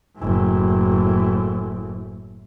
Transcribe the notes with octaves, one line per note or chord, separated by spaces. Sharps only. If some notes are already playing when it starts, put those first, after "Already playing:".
F#1 A2